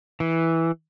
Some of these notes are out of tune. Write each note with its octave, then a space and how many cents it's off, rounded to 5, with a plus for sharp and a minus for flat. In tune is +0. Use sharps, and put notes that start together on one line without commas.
E3 -5